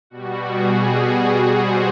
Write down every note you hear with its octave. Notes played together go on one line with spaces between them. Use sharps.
B2 G3 F#4
G#4
C5